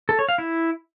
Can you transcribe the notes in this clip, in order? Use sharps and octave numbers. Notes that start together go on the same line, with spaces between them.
A4
C#5
F5
E4